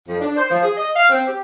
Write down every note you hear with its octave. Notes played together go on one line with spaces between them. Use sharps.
F2
D4
C5
F3
G#4
D#5
F5
C4
G4